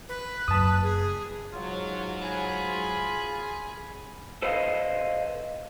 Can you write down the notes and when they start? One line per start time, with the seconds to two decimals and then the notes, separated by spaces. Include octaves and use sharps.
0.09 B4
0.48 F#1 F#2 A5 D#6
0.83 G#4
1.52 G#2 F#3 F4
2.21 G#4 B5
4.42 A4 B4 C5 D#5 F5